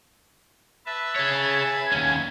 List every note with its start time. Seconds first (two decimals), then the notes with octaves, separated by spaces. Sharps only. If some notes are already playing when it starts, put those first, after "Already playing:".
0.86 B4 E5 A5
1.16 G#4 C#5 G#6
1.92 D#2 C#4